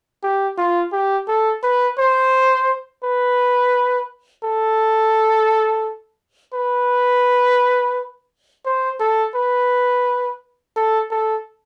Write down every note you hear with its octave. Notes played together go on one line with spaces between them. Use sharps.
G4
F4
G4
A4
B4
C5
B4
A4
B4
C5
A4
B4
A4
A4